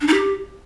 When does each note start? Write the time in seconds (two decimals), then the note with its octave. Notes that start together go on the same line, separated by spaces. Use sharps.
0.01 D4
0.07 D#4
0.14 G4